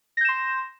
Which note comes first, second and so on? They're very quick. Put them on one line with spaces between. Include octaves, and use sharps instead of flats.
A#6 G6 E7 C6